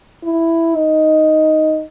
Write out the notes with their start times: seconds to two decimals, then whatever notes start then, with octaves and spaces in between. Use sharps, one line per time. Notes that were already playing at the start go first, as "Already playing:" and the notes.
0.24 E4
0.75 D#4